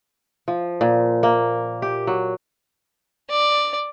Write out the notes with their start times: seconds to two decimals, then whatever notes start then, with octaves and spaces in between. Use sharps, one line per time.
0.48 F3
0.81 A#2
1.23 A#3
1.82 G4
2.07 F#3
3.30 D5